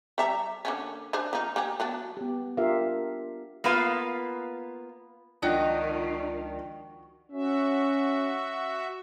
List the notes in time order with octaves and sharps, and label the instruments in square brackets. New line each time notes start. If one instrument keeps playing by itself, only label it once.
[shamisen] G3 E5 A#5
D3 A#3 C#4
D4 G#4 C5
F3 A#3 D#4
A#3 G4 G#4
F#3 B3 D4
[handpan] B3 G4
D4 F4 G4 A#4 E5 F5
[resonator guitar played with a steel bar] A#3 B3 F4 B4 F5
[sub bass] C#2 [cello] D#3 [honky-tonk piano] F3 D4 [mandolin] F#4 G4 D#5
[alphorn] C#4 [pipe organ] F#4 E5